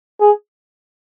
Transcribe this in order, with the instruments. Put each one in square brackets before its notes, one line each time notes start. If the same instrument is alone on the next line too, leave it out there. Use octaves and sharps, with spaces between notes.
[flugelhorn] G#4